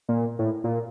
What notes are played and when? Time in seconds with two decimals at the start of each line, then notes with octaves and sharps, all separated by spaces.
0.09 A#2
0.39 A2
0.64 A#2